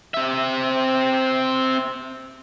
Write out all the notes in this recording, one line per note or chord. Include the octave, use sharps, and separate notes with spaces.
C4 E5